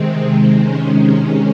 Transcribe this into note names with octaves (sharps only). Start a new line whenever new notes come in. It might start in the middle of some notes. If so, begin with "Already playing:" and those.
Already playing: C3 D#3 G#3 C4
C3 D#3 G#3 C#4